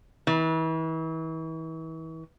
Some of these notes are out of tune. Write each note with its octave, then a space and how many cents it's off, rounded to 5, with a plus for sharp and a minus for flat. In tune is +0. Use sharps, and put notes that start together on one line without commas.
E3 -35